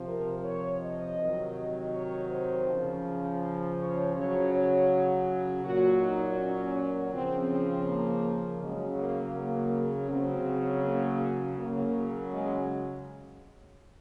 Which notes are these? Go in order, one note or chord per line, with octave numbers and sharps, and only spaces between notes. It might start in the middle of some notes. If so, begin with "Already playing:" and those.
Already playing: C3 F3
A#4
C#5
D#5
C3 D#3 F#3
C#5
C5
C#3 F3
C#5
C#3 F#3 C#5
C#5
A#2 F#3 F#4
D#4
C#4
C#3 F3 C4
C4
A#3
C#3 F#3 G#3
A#3
A#3
C#3 F#3 C4
A#3
C#3 F#3 A#3
G#3